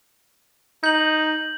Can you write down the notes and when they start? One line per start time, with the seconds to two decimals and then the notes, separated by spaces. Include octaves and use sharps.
0.84 D#4 G6 F#7